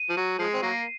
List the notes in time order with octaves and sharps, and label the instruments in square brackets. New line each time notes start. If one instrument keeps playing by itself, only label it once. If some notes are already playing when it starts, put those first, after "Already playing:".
Already playing: [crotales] D#7
[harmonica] F3
F#3
[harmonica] F3 G#3 [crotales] C7
[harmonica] C4
F#3 A#3